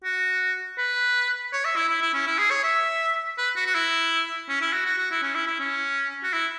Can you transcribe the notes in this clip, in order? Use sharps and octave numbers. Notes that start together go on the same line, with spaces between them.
F#4
B4
C#5
E5
E4
E4
E4
C#4
E4
G#4
C#5
E5
B4
F#4
F#4
E4
C#4
E4
F#4
F#4
F#4
E4
C#4
E4
E4
C#4
F#4
E4